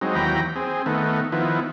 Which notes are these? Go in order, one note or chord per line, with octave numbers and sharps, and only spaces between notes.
F#3 G#3 C4 D#4
D#2 E3 F#3 G5 A#5 B5
C4 G#4
D#3 A3 B3
D#3 F3 B3 E4